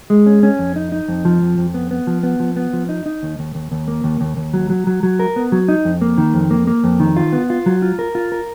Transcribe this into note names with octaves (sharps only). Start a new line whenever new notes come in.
G#3
C#4
C#4
F2
D#4
D#4
F2
F3
F2
F2
B3
B3
F3
B3
F3
B3
F3
D#4
D#4
D#2
D#2
D#2
D#2
A#3
D#2
D#2
D#2
F#3
F#3
F#3
F#3
A#4
B3
F#3
D#4
F2
A#3
D#3
F2
A#3
A#3
F2
D#3
F4
B3
F4
F#3
F4
A#4
F4
A#4